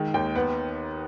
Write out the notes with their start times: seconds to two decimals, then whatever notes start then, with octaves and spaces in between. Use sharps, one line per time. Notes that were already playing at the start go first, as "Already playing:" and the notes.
Already playing: D#3 G#3
0.14 D#2 G5
0.35 B3 F#5